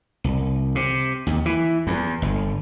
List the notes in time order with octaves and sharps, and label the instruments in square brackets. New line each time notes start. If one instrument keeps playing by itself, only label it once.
[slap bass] C2
C3
D#2
E3
E2
G1